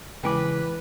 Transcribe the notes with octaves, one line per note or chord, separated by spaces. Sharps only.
E2 C#3 G#3 B4 G5 G#5 D6